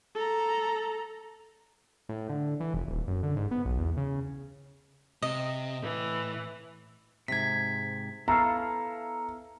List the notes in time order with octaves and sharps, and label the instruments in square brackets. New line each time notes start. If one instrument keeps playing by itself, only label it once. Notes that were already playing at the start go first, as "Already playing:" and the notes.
[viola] A4 A#5
[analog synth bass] A2
D3
E3
F1
D#1
F#2
D3
G#2
B3
B1
E2
C#3
[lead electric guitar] C3 [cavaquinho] D#5
[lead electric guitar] A2 [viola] E3
[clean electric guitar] G#2 C3 [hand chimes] G#6 B6
[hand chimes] B3 [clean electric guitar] E4 A4 F5 [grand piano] A#5